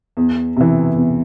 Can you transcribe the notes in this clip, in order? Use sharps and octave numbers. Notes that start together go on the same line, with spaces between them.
E2
C3 E3
E2